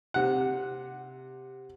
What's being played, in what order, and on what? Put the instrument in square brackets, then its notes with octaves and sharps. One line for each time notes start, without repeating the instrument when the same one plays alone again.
[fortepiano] C3 F#5